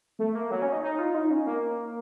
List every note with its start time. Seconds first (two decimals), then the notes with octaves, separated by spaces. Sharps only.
0.19 A3
0.35 A#3
0.51 F#3
0.62 C#4
0.72 D#4
0.83 D#4
0.99 F4
1.15 D#4
1.31 C#4
1.47 A#3